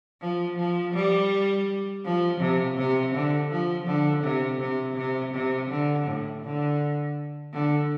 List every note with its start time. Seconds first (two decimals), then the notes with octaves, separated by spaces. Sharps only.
0.21 F3
0.58 F3
0.94 G3
2.05 F3
2.40 C3
2.77 C3
3.14 D3
3.50 F3
3.87 D3
4.24 C3
4.59 C3
4.96 C3
5.33 C3
5.70 D3
6.06 A2
6.43 D3
7.53 D3